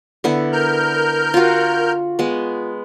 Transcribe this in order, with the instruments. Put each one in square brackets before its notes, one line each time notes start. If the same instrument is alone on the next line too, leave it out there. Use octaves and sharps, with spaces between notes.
[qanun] D3 B3 E4
[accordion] A#4 F6 G6
[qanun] F4 F#4
G#3 B3